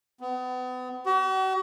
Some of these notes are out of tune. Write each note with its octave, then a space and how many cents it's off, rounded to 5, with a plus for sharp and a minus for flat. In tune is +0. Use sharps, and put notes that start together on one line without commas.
B3 +35
F#4 +45